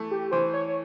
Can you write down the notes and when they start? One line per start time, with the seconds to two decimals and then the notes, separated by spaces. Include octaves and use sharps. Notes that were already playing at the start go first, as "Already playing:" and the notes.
Already playing: E3 A3
0.11 G4
0.32 E3 C5
0.54 C#5
0.68 C#5